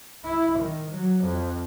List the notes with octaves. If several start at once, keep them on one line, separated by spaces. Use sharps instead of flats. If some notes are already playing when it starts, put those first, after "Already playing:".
E4
D#3
F#3
F2